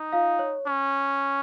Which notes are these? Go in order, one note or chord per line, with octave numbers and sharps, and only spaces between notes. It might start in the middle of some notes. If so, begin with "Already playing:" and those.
Already playing: D#4
F4 F5
C#5
C#4